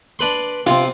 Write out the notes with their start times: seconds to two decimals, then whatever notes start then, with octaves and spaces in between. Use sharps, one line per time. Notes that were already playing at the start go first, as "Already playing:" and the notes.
0.19 D4 B4 C6
0.66 C3 C4 F4